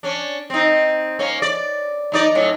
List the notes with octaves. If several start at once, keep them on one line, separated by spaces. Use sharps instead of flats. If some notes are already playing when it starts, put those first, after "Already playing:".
C#4 D4
C4 D#4
A#3 C#4
D5
D#2 D#4 D5
A2 F#3 C#4